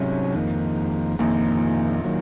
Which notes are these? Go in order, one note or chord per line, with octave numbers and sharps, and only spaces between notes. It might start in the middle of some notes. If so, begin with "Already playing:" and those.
Already playing: C2 G#2 C3 F#3 C#4
F2 D#3 A#3
A#1 F2 A#2 D#3 A#3
D#3 F#3 A#3